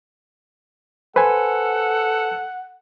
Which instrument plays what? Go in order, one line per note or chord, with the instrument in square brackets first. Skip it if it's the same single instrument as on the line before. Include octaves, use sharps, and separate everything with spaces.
[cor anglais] A4 [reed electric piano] B4 C5 G#5 [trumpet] F#5